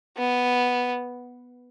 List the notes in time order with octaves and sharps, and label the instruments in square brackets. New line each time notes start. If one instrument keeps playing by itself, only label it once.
[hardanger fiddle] B3